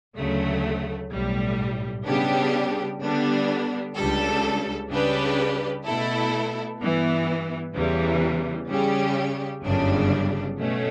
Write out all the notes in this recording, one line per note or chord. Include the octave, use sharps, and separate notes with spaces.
D2 C#3 F#3 A3
B1 A2 G3
C#3 G3 B3 D4 G4
D3 G3 B3 D4
C#2 C#3 G3 D4 A4
C#3 G3 D4 G4 B4
B2 A3 E4 A4
G2 E3 B3
E2 C#3 E3 G3
C#3 G3 C#4 G4
G1 F#2 C#3 G3 D4
B2 A3 C#4